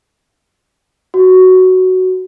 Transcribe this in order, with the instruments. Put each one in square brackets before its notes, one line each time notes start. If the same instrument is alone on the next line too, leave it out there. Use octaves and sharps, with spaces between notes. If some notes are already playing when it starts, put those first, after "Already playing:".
[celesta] F#4